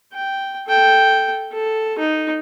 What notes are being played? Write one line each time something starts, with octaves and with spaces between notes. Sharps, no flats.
G5
A4 G5
A4
D#4